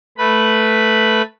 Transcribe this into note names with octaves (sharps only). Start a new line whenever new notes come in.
A3 B4 B5